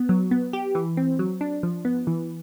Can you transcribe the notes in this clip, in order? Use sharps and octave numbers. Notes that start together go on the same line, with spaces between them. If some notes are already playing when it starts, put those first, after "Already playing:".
Already playing: B3
F#3
B3
G4
E3
C4
F#3
D4
F3
B3
E3